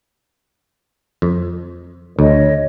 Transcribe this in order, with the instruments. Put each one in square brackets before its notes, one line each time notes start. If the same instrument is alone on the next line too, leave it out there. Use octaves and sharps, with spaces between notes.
[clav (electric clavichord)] F2
[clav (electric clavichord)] D2 [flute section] C#5 D#5